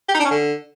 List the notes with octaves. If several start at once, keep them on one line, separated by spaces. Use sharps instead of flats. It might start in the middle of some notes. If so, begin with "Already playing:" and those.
G4
D#4
D4
C#4
D3